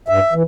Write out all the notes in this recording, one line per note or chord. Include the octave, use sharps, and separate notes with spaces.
G2 E5
E3